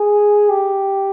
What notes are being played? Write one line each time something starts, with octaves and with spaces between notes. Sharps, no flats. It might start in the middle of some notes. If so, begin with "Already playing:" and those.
Already playing: G#4
G4